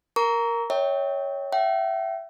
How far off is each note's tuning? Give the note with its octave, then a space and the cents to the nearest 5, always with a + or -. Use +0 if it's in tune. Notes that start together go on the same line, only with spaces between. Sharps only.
A#4 +0 A#5 +0 C#6 +40
C#5 +5 E5 -40 G5 +0
E5 +20 G5 -40